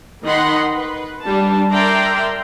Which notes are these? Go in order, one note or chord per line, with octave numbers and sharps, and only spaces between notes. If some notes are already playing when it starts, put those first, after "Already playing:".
D#3 D#4 D#5 F#5 B5 C6
B4
G3 D4 A5
A#4 D5 E5 G5 A#5 C6